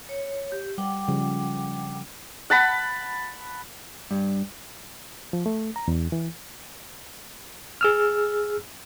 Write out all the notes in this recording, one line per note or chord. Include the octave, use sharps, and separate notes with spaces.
C#5
G4
G3 F#5 G5 D6
C#3 F3 G3
F#5 A5 B5
G2
F3
A3
A#5
E2
E3
G#4 E6 F6